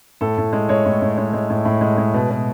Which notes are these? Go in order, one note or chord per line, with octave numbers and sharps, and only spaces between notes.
A2 A4
A2
G#3
G#3 C#5
A2
A2
G#3
G#3
A2
A2
G#3
G#3
B2
B2